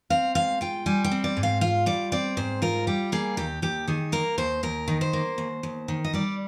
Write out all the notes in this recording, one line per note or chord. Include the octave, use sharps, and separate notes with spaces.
C4 F5
G#2 F5
F4 G5
G3 G#5
G5
C4
D5
G#2
F5
F4 F5
G3 D5
C4 D5
G#2 C5
F4 A#4
G3 G4
A#3 G#4
D#2 G4
D#2 G4
D#3 G#4
A#3 A#4
D#2 C5
D#2 A#4
D#3
C5
A#3
D#2
D#2
D#3
D#5
G3 D5